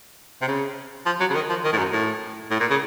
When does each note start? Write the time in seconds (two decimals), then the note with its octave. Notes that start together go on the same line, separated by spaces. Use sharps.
0.42 C3
0.47 C#3
1.06 F3
1.20 F#3
1.30 C#3
1.35 D#3
1.49 F3
1.64 D#3
1.73 A2
1.78 F#2
1.92 A2
2.51 A2
2.60 A#2
2.71 C#3